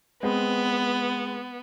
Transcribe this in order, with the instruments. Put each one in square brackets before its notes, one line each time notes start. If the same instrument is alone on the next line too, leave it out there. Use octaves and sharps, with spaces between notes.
[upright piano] G#3 C4 B4 [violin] B3